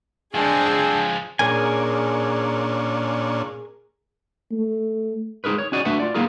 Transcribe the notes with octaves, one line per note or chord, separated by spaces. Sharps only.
F3 G#3 C4 D4 G#4 A5
A#2 C#4 D4 G#4 A#4 G#5
A3
G#3 D#4 G#4 A#4 B4
C#5
C#4 D#4 F#4 G#4 D5 D#5
A3 D4 F#4 B4 E5 F#5
F4 D5
A#3 B3 D#4 F4 G#4 A#4